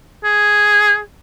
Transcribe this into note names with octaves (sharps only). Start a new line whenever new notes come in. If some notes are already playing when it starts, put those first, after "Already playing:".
G#4